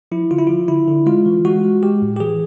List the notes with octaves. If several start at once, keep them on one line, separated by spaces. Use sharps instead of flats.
F3 E4
D3 F4
E4
F3 F4
D3 E4
D3
G#3 F4
E3
G#3 F#4
G#3
G#3 G4
A2
G4
E3 G#4